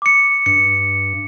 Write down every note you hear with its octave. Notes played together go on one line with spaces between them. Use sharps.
D6 C#7
G2 C#7